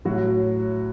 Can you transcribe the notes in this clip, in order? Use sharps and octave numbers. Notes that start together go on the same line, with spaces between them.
A2 F#3 F#4